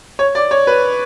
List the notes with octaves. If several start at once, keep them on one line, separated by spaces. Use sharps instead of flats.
C#5
D5
C#5
B4